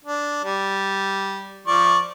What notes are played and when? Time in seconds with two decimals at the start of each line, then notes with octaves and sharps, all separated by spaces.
0.05 D4
0.45 G3
1.67 F3 D5 C#6